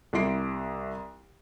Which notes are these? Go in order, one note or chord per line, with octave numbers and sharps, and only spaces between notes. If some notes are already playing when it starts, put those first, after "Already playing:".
C2 E4 C6 C7 D7